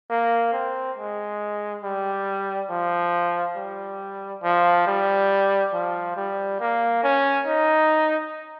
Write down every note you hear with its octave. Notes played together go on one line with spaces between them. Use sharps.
A#3
C4
G#3
G3
F3
G3
F3
G3
F3
G3
A#3
C#4
D#4